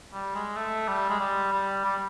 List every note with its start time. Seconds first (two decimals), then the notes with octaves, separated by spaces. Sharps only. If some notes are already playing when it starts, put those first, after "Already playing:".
0.14 G3
0.35 G#3
0.56 A3
0.88 G3
1.09 G#3
1.20 G3
1.52 G3
1.84 G3